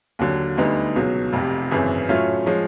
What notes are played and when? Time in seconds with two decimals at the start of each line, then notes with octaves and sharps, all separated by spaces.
0.19 D#2 D3 F#3
0.58 D2 D3 G3 B3 D#4
0.96 C#2 B2 F#3
1.33 F1 F2 C3
1.71 G#1 F#2 C#3 E3
2.09 A2 F#3 A3 C#4 F4
2.46 F3 G#3 C#4